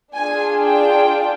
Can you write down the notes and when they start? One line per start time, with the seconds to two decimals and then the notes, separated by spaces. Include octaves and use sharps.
0.14 D4 F4 G#4 G#5
0.60 G5